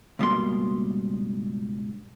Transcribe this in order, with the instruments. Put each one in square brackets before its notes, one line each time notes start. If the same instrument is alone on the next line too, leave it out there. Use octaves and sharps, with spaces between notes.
[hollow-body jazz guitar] C#2 G2 B2 G3 A#3 C6